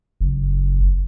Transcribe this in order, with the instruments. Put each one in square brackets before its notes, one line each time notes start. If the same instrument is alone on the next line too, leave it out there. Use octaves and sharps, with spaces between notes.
[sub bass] F#1